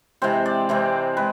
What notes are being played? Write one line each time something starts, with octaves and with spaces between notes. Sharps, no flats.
C3 E3 G#3 C4 C5
D5
C3 E3 G#3 C4
G#3 B4